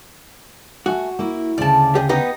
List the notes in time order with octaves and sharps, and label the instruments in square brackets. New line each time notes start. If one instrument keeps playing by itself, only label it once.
[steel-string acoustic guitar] A3 G#5 [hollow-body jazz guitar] F#4
[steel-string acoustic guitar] A#3 E4
[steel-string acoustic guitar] D2 C#3 [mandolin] D5 A5
[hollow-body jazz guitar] G4 G#4 D#5
[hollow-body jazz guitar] B3 G4 D#5 [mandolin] D#4